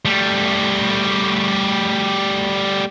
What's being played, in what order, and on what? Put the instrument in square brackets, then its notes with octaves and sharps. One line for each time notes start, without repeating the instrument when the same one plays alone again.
[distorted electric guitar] G3 A3